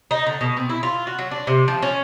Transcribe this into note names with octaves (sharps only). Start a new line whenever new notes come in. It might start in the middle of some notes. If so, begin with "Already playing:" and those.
D#4
D3
B2
C4
E4
F4
F#4
F#3
D4
C3
F3
C#4